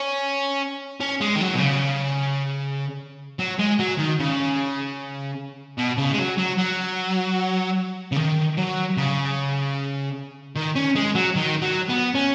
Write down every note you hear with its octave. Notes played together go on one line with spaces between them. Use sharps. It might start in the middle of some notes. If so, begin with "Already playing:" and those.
Already playing: C#4
C#4
G#3
D#3
F#3
B2
C#3
F#3
G#3
F#3
D#3
C#3
B2
C#3
G#3
F#3
F#3
F#3
C#3
D#3
F#3
C#3
D#3
C#4
G#3
F#3
D#3
F#3
B3
C#4